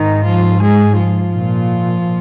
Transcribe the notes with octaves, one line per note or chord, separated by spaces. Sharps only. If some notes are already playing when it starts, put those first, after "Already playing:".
Already playing: G#2 D#3 D#4
F3 F4
G#3 G#4
F3 F4
A#2